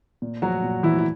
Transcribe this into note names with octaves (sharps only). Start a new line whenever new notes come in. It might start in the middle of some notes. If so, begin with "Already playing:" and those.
A#2
F3 F#3 F#4
A#2
E3 F3 E4
E4